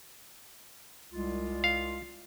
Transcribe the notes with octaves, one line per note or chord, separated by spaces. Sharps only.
C2 G#3 F4
F5